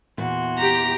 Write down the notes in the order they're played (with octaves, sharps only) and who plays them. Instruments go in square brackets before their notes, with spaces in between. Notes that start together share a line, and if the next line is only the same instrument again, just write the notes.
[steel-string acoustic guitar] E2 A#2 E3 [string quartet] F#4 C6
[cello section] G4 [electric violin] A#5